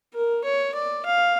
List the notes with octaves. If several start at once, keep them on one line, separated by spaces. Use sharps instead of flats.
A#4
C#5
D5
F5